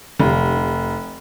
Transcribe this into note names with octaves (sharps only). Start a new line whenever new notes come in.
F1